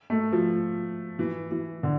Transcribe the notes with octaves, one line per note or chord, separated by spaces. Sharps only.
A3
F3
E3
E3
D3